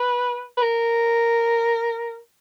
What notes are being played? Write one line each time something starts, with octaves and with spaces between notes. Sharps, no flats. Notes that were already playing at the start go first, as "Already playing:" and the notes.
Already playing: B4
B4
A#4